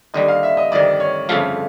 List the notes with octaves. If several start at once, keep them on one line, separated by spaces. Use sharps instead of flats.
D#2 D3 G3 D#5
F5
E5
D#5
G1 F2 C3 D#3 D5
C#5
G1 F2 C#3 F3 A3 F5